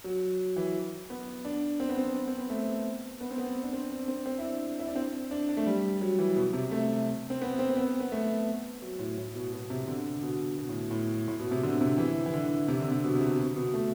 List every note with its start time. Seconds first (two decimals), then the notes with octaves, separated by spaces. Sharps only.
0.04 F#3
0.57 E3
1.10 B3
1.45 D4
1.80 C4
1.89 B3
1.98 C4
2.28 C4
2.38 B3
2.50 A3
3.21 B3
3.31 C4
3.38 B3
3.63 D4
3.73 C4
3.90 D4
4.08 C4
4.26 C4
4.39 E4
4.43 D4
4.79 E4
4.87 D4
4.96 C4
5.31 D4
5.49 D4
5.57 A3
5.66 G3
6.01 F#3
6.19 E3
6.36 B2
6.53 C3
6.71 A3
7.30 C4
7.42 B3
7.59 C4
7.70 C4
7.77 B3
8.00 B3
8.12 A3
8.82 F#3
8.99 A2
9.18 A2
9.35 B2
9.52 B2
9.70 C3
9.88 D3
10.22 B2
10.58 B2
10.69 A2
10.91 A2
11.28 A2
11.39 B2
11.51 C3
11.63 D3
11.81 C3
11.98 E3
12.26 E3
12.33 D3
12.68 C3
12.80 D3
12.91 C3
13.04 B2
13.15 C3
13.21 B2
13.39 B2
13.56 B2
13.74 A3